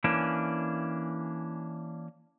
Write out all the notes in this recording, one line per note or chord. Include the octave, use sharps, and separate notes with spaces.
E3 A#3 C#4 D4